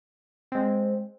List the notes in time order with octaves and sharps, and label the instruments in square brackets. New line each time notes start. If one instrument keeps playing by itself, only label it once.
[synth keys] G#3 C4